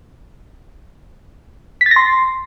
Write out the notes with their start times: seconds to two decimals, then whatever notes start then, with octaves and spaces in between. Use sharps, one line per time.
1.81 B6
1.86 A6
1.91 A#6
1.96 C6